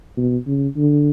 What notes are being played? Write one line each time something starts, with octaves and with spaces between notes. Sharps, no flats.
B2
C#3
D3